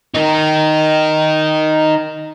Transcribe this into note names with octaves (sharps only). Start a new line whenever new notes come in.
D#4 A#4